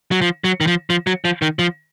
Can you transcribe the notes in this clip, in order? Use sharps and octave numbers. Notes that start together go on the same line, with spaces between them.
F#3
F3
F#3
D#3
F3
F3
F#3
F3
D#3
F3